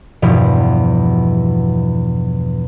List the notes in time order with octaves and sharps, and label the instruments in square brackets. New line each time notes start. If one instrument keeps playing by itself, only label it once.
[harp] E2 G2 B2 F3